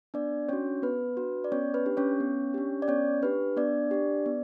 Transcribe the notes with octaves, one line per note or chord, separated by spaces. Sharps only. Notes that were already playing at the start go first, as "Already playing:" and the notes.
B3 D4 D5
C#4 D4 F#4 C#5
B3 B4
D4 F#4
D5
B3 C#4 C#5
B4
D4 G4
C#4 C#5
B3
D4 G4
D5
B3 C#4 C#5
D4 G4 B4
B3 D4 D5
D4 G4
B3